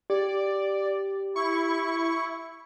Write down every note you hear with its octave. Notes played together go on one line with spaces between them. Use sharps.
G4 D5
E4 C#6